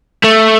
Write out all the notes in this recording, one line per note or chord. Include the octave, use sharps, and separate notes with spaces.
A3